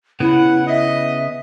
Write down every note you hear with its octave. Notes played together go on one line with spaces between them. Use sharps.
C#3 B3 E4 F#5
D#5 E5